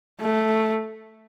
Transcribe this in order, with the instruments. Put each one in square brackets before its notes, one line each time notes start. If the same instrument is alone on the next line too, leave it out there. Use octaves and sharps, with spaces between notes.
[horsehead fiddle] A3